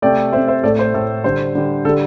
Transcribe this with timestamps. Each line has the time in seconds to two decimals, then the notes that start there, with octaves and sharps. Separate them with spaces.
0.02 C3 A3 D5 G5
0.33 A3 C5 E5
0.36 C3
0.48 C5 E5
0.63 A2 A3 A4 D5
0.79 C5
0.94 A2 A3 A4
1.24 D3 G3 C5
1.55 D3 G3
1.85 D3 A4
1.89 G3